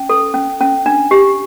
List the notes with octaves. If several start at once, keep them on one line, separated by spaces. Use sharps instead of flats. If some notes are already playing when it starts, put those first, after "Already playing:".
Already playing: C#4
A4
C#4
C#4
D4
G4